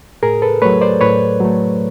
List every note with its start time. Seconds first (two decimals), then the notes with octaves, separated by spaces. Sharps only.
0.23 A2 G#4 A#4
0.42 A4 B4
0.62 F#3 A3 B4 C#5
0.81 C5 D5
1.01 A2 B4 C#5
1.40 F#3 A3